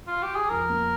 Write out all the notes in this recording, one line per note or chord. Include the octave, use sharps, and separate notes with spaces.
F4
G4
G#4
F2 A#4
A#3